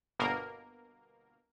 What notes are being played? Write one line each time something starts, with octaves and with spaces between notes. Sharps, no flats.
G1 B2 A#3 A#4